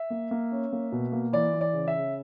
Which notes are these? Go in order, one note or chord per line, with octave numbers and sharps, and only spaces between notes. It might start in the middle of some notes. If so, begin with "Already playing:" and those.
Already playing: E5
A#3
A#3
C#4
A#3
B2
A#3
E3 D5
E3
D5
C#3
E5
C#3